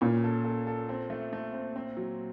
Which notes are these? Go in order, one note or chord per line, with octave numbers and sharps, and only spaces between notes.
A#2 C#4
A4
A4
A4
C4
A3
A3
C4
C4
F#3